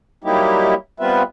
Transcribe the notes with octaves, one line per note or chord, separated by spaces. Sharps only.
F#3 G3 A#3 D#4 E4 G4
G3 B3 C4 F4 B4 E5